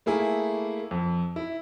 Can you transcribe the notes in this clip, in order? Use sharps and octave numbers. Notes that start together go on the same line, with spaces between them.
A3 A#3 E4 G#4
F2
E4